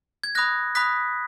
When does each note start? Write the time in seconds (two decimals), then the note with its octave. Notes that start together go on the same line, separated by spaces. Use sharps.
0.24 G#6
0.35 B5 D#6 F#6 A#6
0.75 B5 D#6 F#6 B6